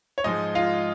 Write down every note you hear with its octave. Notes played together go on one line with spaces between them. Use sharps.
C#5
G#2 F3 G#3 D#4 D#5
F4 F5